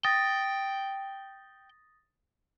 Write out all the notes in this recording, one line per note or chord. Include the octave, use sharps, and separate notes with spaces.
G5 D#6 A6 A#6